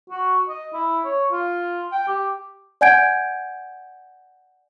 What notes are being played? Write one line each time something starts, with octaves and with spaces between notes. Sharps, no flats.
F#4
D#5
E4
C#5
F4
G5
G4
D5 F#5 G#5 G6 G#6 D7